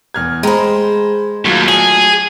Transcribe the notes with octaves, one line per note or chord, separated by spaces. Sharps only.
E2 F6 G#6
G#3 C5 G5 A#5 B5
D#2 F#3 A3 F4
D2 G#4